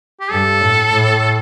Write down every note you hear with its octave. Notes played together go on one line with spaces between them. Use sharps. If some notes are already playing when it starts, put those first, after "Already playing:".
G4
G2 A4
A2
A2